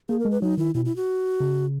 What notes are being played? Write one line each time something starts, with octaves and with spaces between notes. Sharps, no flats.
A#3 G#4
A#4
G#3
B4
F#3 D#4
D#3 E4
B2 E4
E4
F#4
C#3